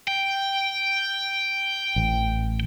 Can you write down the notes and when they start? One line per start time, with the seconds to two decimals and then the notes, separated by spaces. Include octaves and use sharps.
0.08 G5
1.96 A1